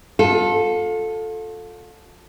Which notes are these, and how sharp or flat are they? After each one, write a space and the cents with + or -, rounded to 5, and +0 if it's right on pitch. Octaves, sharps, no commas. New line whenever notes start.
F4 +35 A4 +0